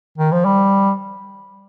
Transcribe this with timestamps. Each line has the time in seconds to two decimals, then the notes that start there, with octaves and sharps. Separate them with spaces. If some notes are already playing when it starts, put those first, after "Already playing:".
0.18 D#3
0.32 F3
0.45 G3